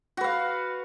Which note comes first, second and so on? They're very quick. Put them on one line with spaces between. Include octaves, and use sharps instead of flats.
F#4 B4 F5